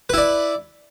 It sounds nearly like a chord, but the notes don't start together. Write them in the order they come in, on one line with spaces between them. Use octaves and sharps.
B4 E4 D5